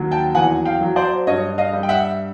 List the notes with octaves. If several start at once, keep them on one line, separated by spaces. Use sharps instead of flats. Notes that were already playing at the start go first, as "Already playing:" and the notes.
Already playing: D#2 F#3
G5 A5
E2 F#5 G#5
F5 G5
F#3
C5 D5
G2 C#5 D#5
D#5 F5
G3
G5
E5 F#5